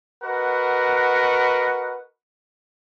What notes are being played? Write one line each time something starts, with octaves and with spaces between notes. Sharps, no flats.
F#4 A#4 B4 D#5 F#5